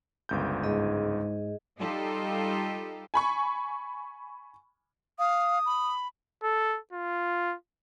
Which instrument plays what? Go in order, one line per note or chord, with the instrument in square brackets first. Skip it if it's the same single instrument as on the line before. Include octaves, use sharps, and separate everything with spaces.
[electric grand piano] G1 C#2 G6
[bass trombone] G#2 [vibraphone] G#4 D#5
[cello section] G3 D#4 F4 G4 A4
[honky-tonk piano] G#5 B5 C#6
[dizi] F5 [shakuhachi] D#6
[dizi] B5
[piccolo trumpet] A4
F4